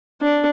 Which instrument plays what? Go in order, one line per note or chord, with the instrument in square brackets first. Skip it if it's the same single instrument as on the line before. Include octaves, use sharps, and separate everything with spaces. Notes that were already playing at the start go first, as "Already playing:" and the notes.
[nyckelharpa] D4